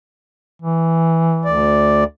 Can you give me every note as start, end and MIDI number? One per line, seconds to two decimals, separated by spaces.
0.62 1.66 52
1.45 2.04 38
1.45 2.04 74